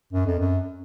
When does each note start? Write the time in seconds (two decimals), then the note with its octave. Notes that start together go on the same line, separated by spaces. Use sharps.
0.13 F#2
0.26 F2
0.40 F#2